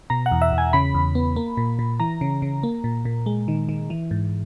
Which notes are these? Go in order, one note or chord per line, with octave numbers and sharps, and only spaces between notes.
B2 A#5
F#5
E2
E5
E2
G#5
C#3 B5
E2
B3
A#3
A#2
A#2
E3 A#5
C#3
C#3
A#3
A#2
A#2
G#3
D#3
D#3
E3
G#2